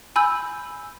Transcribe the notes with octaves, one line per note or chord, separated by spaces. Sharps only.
G#5 B5 E6 G6